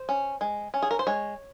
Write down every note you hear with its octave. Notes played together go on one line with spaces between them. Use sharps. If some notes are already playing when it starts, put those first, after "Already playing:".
Already playing: C5
C#4
G#3
C#4
G#4
A#4
C5
G#3 C#5